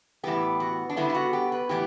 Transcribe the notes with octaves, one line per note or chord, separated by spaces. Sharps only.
A2 E3 G3 B3 G4
F#4
D4
D3 G3 B3 E4
E4
F#4
G4
B4
A2 E3 B3 G4